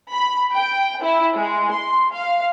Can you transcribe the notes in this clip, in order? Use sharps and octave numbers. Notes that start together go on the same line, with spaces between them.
B5
G5
E4
G#3
C6
F5